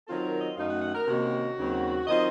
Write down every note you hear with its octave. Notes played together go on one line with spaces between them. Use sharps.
D#3 F#3 C4 F4 A4
A#4
D#5
F#2 D#3 A3 D#4 F5
F#5
F#5
A#4
C3 D#3 A#3 C#4 F#4
D#2 C#3 F#3 C4
D#3 F#3 C4 F4 D#5